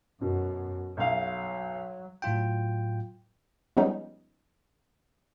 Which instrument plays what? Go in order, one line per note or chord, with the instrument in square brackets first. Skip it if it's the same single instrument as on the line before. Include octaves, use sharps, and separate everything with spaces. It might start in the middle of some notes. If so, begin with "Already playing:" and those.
[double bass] F#2 [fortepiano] B2
[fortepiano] B1 E5 F5 [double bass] F#3
[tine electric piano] A2 F#3 F4 G5
[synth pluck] F3 G3 G#3 B3 C#4 D#4